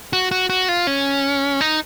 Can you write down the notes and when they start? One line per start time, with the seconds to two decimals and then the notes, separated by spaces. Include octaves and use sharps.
0.13 F#4
0.31 F#4
0.50 F#4
0.69 F4
0.87 C#4
1.61 D#4